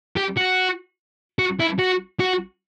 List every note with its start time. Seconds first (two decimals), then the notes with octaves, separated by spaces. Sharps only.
0.17 G4
0.37 F#4
1.39 F#4
1.60 E4
1.79 F#4
2.20 F#4